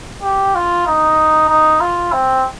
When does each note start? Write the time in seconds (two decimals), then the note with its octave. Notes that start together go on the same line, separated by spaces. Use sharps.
0.23 G4
0.55 F4
0.87 D#4
1.49 D#4
1.81 F4
2.12 C4